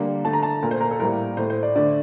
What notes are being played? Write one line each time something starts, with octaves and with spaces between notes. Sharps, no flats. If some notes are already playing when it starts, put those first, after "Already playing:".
Already playing: D3 G3 A#3
D3 A3 A5
A#5
A5
A#2 A3 A#4
C5
A#4
A4
A2 G3 A#3 A#4
A2 A3 C5
C5
D5
D3 A3 D5